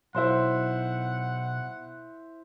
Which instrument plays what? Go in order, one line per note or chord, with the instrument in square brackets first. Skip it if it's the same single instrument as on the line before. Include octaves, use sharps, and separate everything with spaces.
[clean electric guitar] B1 [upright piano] E4 C5 C6 [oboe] F#5